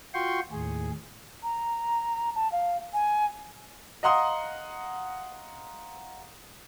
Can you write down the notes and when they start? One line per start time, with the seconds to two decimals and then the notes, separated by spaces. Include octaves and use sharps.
0.14 F4 F#4 G5 C6 C#6
0.52 D#2 A2 G#4
1.43 A#5
2.36 A5
2.52 F5
2.94 G#5
4.03 D#5 F5 F#5 A#5 C6 D#6